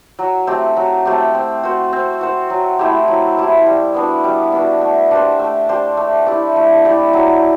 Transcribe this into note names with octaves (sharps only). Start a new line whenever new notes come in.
F#3
A3 C4 G4
F#3
A3 C4 G4
C4
F#4 C5
C4
F#4 C5
F#3
A3 E4 G4
F#3
A3 E4 G4
G3
B3 D4 F#4
G3
B3 D4 F#4
A3
D4 G4 C5
A3
D4 G4 C5
A3
E4 G4 D5
A3
E4 G4 D5
F#3